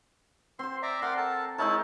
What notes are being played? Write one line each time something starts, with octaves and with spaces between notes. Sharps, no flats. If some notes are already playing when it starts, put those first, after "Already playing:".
C4 C5 C6
D5 E5 A#5
A#4 D5 F#5 C6
A4 A#4 A5
G#3 D#4 E4 A#4 C#5 A5